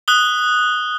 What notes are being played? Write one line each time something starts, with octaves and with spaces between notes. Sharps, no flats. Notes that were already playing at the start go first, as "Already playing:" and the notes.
D#6 F#6 G7